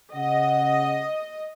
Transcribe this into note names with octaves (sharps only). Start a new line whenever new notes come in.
C#3 D#5 F#5